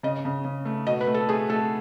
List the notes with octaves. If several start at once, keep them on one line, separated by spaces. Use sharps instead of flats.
C#3 D#5
C#3
C#3
A3
B2 D#5
B4
A3
A4
A3 G#4
A3 A4